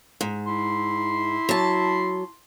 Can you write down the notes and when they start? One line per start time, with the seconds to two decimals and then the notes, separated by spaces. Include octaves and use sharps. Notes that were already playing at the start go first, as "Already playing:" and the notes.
0.21 G#2
0.45 E4 C6
1.49 F#3 A5